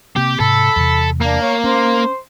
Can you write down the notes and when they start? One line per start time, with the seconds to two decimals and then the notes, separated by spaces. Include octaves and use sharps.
0.16 C3 A#3 C4 G4
0.40 G#2 C3 A4 B5
0.76 E2 C3
1.21 A#3 D4
1.41 C#5
1.64 C#4 C5